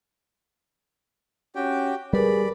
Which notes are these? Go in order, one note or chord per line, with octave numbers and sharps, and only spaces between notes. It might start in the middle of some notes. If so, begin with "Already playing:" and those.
C#4 F#4 G4 G5
G3 G#4 A#4 B4 D5 B5